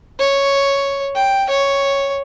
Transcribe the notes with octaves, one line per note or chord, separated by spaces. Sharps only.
C#5
G5
C#5